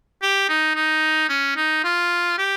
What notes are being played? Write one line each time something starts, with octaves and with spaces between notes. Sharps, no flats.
G4
D#4
D#4
C#4
D#4
F4
G4